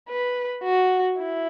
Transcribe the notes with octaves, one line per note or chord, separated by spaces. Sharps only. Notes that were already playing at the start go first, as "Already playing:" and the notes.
B4
F#4
E4